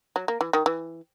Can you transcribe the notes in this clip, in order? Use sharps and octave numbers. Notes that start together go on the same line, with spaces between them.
F#3
A#3
E3
D#3
E3